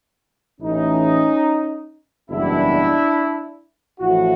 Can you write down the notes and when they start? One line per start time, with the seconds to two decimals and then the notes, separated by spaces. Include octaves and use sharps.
0.60 A1 A2 E3 C#4 D#4
2.30 F#1 E2 B2 G3 D4 E4
3.99 A1 A2 F3 E4 F#4